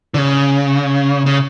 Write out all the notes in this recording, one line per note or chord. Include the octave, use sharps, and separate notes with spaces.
D3
C#3
C#3